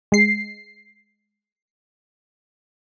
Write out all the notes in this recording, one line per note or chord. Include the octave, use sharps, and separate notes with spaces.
G#3 C7